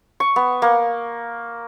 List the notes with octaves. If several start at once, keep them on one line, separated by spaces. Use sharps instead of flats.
C#6
B3
A#3